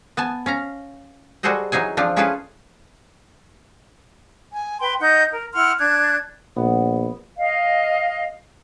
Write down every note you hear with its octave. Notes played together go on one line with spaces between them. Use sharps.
B3 G#5 A5
C#4 F5 A#5
G3 F#4 G#4 A4 C5 D#5
E3 F#3 D#4 G#4 G#5
F3 C4 D4 F4
C#4 E4 F4 G#4 A4 B4
G#5
B4 G5 C6
D#4 D#5 F#5 G6
A#4
E4 F#5 C6 F6
D4 F#6 G#6
A#1 B3
D#5 F5